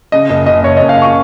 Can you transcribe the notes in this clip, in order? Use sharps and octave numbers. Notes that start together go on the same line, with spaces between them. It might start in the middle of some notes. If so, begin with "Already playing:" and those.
C#3 D#5
F#1 D#5
F#1 D#5
F#1 C#5
F#1 D#5
F5
C#6